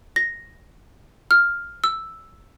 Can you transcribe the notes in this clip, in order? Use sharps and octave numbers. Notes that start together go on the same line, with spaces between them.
A#6
F6
E6